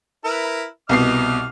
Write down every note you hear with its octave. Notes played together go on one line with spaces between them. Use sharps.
E4 A#4 B4
C2 B2 D#5 D6 F6 C7